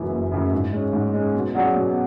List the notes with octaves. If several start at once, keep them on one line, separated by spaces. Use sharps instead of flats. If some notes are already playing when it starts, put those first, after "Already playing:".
Already playing: F#1 F#2 C#3 E3
F#1
F#2 C#3 E3
G#2
G#3 C#4
G#2
G#3 C#4
B2
F#3 C#4 G#4 D5
B2